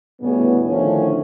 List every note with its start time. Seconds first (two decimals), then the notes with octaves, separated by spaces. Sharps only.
0.21 D2 A2 C#3 G3 B3 C#4
0.67 A2 D3 D#3 F3 C#4